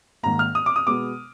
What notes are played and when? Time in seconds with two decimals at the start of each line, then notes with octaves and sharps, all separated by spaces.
0.23 G#2 D#3 A#3 A#5
0.39 F6
0.55 D#6
0.66 D6
0.76 D#6
0.87 B2 G#3 B3 D6